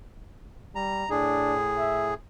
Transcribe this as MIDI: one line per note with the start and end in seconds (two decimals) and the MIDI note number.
0.75 1.05 55
0.75 1.10 82
1.10 2.14 45
1.10 1.55 62
1.10 2.14 68
1.78 2.13 76